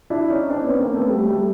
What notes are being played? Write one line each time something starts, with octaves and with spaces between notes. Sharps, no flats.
D4 E4
C#4 D#4
C4 D4
B3 C#4
A#3 C4
A3 B3
G3 A3
G3 A3